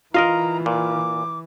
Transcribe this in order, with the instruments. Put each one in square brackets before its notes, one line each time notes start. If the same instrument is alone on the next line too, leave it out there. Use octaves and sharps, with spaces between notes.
[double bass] E3 [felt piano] F4 [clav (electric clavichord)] A#4 D#5 F5 [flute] A#5
[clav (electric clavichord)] A#2 [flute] D6